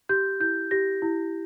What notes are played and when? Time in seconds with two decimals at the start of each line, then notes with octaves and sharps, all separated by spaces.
0.09 G4 G6
0.40 E4 G6
0.71 G4 A#6
1.02 E4